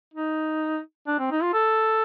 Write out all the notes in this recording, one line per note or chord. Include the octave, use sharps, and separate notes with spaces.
D#4
D4
C4
D#4
F4
A4